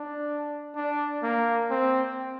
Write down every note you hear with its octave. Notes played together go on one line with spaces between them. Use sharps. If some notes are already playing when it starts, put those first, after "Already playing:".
Already playing: D4
D4
A#3
C4